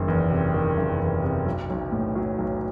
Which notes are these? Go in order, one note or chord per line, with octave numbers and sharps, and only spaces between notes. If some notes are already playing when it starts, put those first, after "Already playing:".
Already playing: F#1 D#3
E2
C3
D#3
F#1
E2
C3
B1
B1
A2
F#3
B1